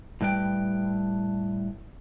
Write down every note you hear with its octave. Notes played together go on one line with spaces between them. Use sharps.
A2 G3 B4 G5